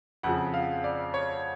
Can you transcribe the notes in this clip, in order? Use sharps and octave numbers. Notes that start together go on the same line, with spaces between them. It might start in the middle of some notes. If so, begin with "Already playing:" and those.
F2 C#3 F3 F#5
F5
D5
C#5